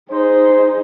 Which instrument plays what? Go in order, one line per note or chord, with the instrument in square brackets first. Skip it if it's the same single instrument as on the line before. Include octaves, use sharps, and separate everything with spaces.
[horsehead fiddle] D#4 G#4 [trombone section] C5